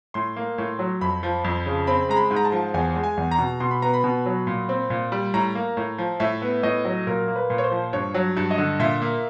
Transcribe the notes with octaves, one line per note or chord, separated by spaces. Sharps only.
A2 C6
A#3
A2
F#3
F2 B5
F3
F2
C#3
C4 B5
G#3 A#5
B5
G#2
A#5
A5
F3
E2 G#5
G#3
G#5
E2
A#5
B2
B2 C6
B5
B3 A#5
B5
B2
F#3
A#2
C4
A#2
G3
A2 A#5
A#3
A2
F3
A2 E5
B3
A2 D#5
F#3
A#2 A#4
A#3
B4
A#2
C#5
C5
F3
G2 C#5
F#3
G2
D#5
D3
A#2 E5
A#3